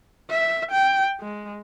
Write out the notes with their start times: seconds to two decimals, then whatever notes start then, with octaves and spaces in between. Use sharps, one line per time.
0.30 E5
0.71 G5
1.20 G#3